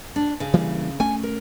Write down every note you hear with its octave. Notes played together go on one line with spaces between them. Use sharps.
D4
C#3
E3 G3 A#3
A3 C#4 G#5
A#4